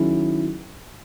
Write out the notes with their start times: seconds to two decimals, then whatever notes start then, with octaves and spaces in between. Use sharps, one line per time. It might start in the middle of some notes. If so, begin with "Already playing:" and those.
Already playing: D#3 F#3 C#4 E4 G#4